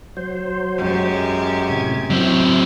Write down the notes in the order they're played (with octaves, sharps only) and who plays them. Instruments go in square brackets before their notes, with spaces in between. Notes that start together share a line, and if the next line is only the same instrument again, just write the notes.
[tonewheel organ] F#3 C5
[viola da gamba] F#2 G#3 G4
[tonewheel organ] A2 C3 G#6
[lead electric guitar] F#3 C4 [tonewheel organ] E4 G5